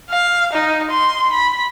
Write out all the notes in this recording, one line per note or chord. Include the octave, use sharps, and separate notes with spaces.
F5
D#4
C6
B5